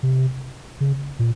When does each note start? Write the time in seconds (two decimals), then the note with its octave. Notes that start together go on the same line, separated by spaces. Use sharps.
0.03 C3
0.81 C#3
1.19 A#2